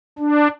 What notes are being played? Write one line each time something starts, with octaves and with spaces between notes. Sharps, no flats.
D4